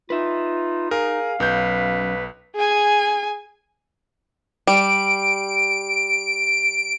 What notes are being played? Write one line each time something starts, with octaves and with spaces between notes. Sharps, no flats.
D#4 F4 B4 E5
G#4 A#4 F5
B1 F#2 B4 G6
G#4 G#5
G3 D7